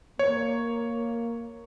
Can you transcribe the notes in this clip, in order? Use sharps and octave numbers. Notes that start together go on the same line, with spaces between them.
A#3 C#5